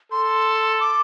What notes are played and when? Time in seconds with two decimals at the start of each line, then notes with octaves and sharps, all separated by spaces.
0.11 A4 C6
0.80 D6